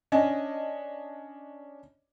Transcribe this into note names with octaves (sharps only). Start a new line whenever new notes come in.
C#4 D4 D#5